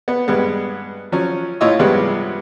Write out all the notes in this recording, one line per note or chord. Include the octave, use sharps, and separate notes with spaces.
B3
G2 G#3 B3
F3 F#3 C#4
A2 F4 C#5 D#5 E6
G2 C3 F3 G#3 B3